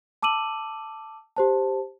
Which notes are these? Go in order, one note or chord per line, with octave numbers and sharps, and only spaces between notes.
A5 D6 E6 D#7 F#7
G4 C5 A5